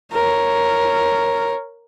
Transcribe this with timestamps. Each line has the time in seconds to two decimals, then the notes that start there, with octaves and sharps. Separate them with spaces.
0.14 A#4 C#5